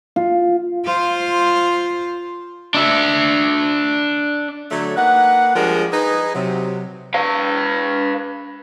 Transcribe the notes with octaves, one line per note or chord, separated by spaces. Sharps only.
F4
F4 C5
D4 E5
D3 F#3 A3 C#5
A#3 D#4 B4 F#5
F3 G3 G#3 D4 G#4 A#4
D#4 G#4 B4
C3 F#3
B4 F5